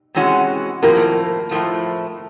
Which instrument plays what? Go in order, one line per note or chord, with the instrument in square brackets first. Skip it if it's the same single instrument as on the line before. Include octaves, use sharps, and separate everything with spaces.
[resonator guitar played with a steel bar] C3 E3 G#3 C#4 F#4
[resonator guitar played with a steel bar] A2 F3 A#3 [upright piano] A#4
[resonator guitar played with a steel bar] A2 F3 A3